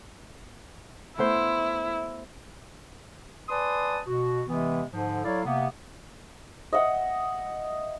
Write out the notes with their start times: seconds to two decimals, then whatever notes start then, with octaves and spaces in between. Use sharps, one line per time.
1.18 A3 B3 E4 C5
3.49 B4 D5 G#5 A5 C6 D#6
4.07 B2 F#4
4.47 C3 E3 G#3 B3
4.92 G#2 D3 F3
5.24 F#3 E4 A4 C#5 D5 F5
5.45 C3 A#3 B3
6.73 D#5 E5 F#5